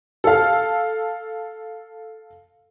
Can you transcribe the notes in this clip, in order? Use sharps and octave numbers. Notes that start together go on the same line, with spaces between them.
A4 F5